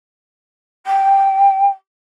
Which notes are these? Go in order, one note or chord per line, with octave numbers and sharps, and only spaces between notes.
G5